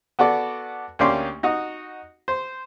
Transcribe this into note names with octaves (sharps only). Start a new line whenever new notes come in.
B3 F#4 A4 D5
D2 A#3 C#4 G4 D5 C6
D#4 F#4 D#5
C5